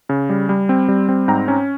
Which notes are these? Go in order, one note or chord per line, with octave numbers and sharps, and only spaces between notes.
C#3
G3
G3
C4
G3
C4
G#2 G5 A#5
C#4